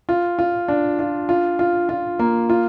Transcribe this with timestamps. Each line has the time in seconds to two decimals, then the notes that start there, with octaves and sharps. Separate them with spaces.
0.09 F4
0.39 F4
0.68 D4
0.99 F4
1.29 F4
1.59 F4
1.89 F4
2.19 A#3
2.50 F4